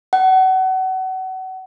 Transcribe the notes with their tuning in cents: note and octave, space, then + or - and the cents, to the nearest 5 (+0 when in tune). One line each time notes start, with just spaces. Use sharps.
F#5 +30